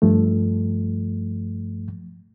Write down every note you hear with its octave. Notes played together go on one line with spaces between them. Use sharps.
G2 F3 A3